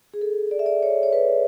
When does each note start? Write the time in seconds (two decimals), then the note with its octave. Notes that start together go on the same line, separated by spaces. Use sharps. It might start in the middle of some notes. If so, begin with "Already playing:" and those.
0.14 G#4
0.21 A4
0.51 D5
0.59 E5
0.66 D5
0.82 C#5
1.03 C#5
1.13 B4